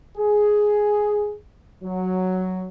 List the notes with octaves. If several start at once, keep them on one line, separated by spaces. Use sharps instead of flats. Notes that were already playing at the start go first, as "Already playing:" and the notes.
G#4
F#3